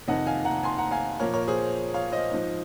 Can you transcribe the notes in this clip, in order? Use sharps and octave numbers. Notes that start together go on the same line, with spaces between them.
F2 C3 D#3 D#5 F#5
F5 G#5
F#5 A#5
G#5 C6
F#5 A#5
F5 G#5
A#2 F3 A#4 C#5
A#4 C#5
G#4 C5
C#5 F5
C5 D#5
G#2 F3